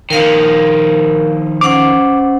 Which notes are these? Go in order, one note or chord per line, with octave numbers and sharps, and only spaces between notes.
D#3 F3 A#4 F5
C#4 C5 F#5 D6